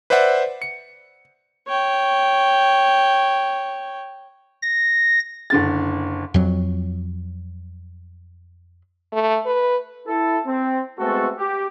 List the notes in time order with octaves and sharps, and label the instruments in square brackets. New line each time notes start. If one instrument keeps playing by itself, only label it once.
[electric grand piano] B4 C5 D5 E5 F#5
C#7
[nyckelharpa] C#5 G5
[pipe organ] A#6
[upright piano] F#1 D3 A6
[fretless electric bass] F2 F#3
[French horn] A3
B4
[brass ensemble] E4 A4
C4
G#3 A3 B3 C4 F#4 A4
G4